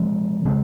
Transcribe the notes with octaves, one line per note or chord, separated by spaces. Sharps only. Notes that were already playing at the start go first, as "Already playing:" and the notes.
Already playing: C3 F3 G#3 C4
C#3 G#3 C4